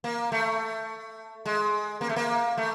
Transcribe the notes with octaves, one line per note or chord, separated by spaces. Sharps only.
A#3
A3
G#3
A#3
A3
A#3
A3